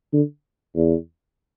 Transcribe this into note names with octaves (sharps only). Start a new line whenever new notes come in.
D3
E2